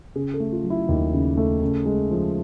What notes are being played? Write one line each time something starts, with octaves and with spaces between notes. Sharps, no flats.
C#3 G#4
A4
A3
F4
F#3
E4
D#2
C#3
A3
C#3
G#3
F3